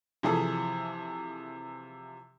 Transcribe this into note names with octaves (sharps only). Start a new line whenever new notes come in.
C3 E3 F3 G#4 A4